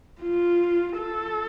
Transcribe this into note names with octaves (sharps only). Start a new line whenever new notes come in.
F4
A4